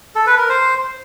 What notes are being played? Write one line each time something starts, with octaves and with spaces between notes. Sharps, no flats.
A4
B4
A#4
C5